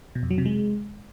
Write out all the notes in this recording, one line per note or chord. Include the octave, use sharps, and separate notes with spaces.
B2
F2
F#3
C3
G#3